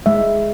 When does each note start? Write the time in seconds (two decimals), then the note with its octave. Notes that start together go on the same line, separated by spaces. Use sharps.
0.06 G#3 E5